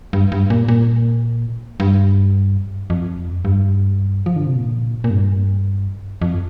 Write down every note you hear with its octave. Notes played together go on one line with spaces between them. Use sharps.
G2
G2
A#2
A#2
G2
F2
G2
F3
D3
C3
A#2
A#2
G2
F2